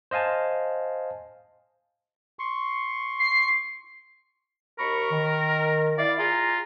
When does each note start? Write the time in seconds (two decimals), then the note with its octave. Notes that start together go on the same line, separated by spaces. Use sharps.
0.11 C5 D#5 F5 G#5 A5
2.39 C6 C#6
3.19 C7
4.79 D#2 A#4 B5 C#6
5.11 D#3
5.98 E4 D5 F5
6.19 F4 G#4 A#5